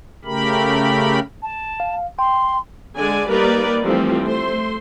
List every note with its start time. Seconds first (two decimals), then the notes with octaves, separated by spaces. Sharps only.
0.25 C#3 A3 G4 A#4 B5
1.42 A5
1.80 F5
2.19 G5 C6
2.96 D3 G#3 D5 G#5
3.30 G3 A#3 D#4 A#4 B4 D5
3.83 E3 F3 G3 A3 C4
4.24 A3 C5 C6